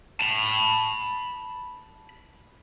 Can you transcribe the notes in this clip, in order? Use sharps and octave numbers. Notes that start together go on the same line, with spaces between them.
A5 B5